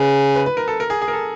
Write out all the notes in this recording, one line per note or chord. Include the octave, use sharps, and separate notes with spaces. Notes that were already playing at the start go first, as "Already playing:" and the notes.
Already playing: C#3 B4
B4
B4
A#4
A4
A#4
G#4
G#4
A#4
A4